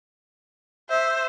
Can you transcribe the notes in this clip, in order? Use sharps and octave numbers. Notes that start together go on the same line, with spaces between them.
C5 E5